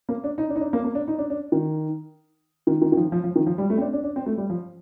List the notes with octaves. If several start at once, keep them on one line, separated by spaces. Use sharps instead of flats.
A#3
D4
D#4
D4
D#4
D4
A#3
A#3
D4
D#4
D4
D4
D#3
D#3
D#3
D#3
F3
F3
F3
D#3
F3
G3
A3
C4
D4
D4
D4
C4
A3
G3
F3